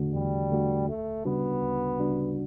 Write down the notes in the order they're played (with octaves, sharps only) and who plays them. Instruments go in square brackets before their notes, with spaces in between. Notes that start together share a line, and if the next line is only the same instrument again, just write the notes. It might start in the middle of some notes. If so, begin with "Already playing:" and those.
Already playing: [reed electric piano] E2 D3 A3 D4 F#4
[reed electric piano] E2 [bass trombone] G3
[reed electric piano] D3 A3 D4 F#4
[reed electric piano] D2 [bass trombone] A3
[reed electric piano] C#3 G3 D4 F#4 [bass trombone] B3
[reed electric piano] D2
C#3 G3 D4 F#4